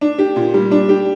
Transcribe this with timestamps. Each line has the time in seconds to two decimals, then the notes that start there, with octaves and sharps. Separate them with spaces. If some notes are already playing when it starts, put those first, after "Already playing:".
0.01 D4
0.18 G4
0.36 A#2
0.54 G3
0.71 D4
0.89 G4